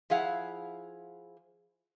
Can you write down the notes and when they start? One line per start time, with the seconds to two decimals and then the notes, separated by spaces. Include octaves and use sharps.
0.10 F3 E4 G#4 F5 F#5